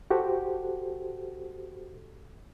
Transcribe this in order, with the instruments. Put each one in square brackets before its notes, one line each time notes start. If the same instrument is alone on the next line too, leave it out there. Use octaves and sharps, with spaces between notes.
[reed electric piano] F#4 G4 A4 C5